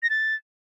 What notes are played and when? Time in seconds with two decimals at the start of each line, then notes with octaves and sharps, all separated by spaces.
0.03 A#6
0.10 A6